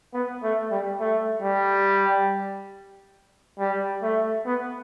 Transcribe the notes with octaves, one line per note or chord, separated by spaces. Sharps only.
B3
A3
G3
A3
G3
G3
A3
B3